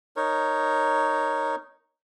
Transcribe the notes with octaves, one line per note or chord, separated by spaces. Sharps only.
D#4 A#4 C#5